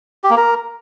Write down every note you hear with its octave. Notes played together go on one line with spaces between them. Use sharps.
G4
A#3
A#4